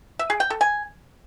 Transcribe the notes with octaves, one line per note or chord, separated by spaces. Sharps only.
E5
G#4
G5
A4
G#5